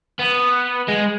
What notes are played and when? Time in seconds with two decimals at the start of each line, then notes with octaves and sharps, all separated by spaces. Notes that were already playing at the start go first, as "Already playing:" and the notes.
0.19 B3
0.88 G#3